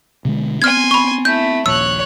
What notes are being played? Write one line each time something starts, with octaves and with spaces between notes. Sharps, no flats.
B2 D3 G#3
B3 C4 G#5 C6 F6 G#6
B5 C#6
A3 E4 G6
D#1 A#1 C#5 E6 F#6